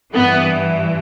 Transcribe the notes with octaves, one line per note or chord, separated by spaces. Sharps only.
G2 E3 B3